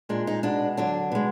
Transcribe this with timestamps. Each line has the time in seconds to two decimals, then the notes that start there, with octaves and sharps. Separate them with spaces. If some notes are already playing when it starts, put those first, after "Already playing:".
0.09 A#2 G#3 D4
0.27 D#4
0.43 B2 G#3 D4
0.77 D3 F#3 D4
1.12 B2 G#3